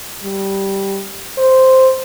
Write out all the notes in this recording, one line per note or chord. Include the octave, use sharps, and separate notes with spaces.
G3
C5